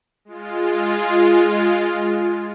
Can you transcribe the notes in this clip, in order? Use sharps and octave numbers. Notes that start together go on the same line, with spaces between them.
G#3 F4